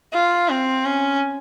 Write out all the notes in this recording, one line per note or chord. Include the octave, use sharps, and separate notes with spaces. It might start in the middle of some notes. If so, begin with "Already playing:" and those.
F4
C4
C#4